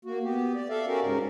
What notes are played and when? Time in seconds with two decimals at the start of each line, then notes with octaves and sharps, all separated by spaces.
0.05 A#3 F#4
0.23 B3 G4
0.55 D5
0.70 A4 D5 E5 F5
0.87 C#4 F#4 G4 A#4 D5
1.01 G#2 C#3 A#4